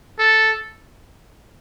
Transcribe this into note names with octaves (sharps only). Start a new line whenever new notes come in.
A4